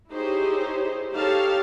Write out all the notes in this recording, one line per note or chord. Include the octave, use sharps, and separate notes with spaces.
D#4 E4 G4 G#4 C5 C#5
D#4 G4 A4 C#5 F5 A5